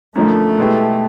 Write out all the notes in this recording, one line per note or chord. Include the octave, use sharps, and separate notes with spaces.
F#2 D3 F3 A3 A#3 D#4
B2 G#3 B3 E4 G4